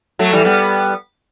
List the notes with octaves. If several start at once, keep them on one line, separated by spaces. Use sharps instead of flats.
F#3 A3
E3 G3
G3 B3